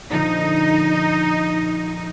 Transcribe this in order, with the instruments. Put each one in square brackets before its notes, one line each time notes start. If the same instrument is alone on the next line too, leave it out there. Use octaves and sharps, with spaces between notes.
[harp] A#2 D3 F3 [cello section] D#4